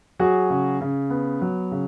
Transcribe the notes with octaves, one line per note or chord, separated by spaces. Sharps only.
F#3 F#4 G#4
C#3
C#3
B3
F#3
C#3